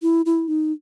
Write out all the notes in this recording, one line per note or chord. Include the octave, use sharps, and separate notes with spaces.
E4
E4
D#4